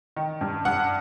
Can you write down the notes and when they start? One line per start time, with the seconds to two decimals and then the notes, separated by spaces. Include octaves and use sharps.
0.17 D#3
0.41 G2
0.65 G2 F#5